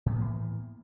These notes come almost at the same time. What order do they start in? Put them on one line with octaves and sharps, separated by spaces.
A2 B3 A#3 E3